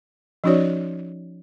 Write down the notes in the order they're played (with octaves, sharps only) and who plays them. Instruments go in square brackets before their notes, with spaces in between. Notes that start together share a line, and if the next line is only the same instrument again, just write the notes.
[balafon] F3 C#4 D#4 F#4 C#5 D5